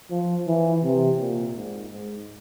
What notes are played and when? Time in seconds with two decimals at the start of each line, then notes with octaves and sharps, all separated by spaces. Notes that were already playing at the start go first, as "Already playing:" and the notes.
0.11 F3
0.47 E3
0.84 C3
1.20 A#2
1.56 G#2
1.92 G#2